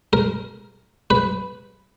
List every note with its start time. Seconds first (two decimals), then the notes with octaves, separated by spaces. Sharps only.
0.13 A#4
1.10 B4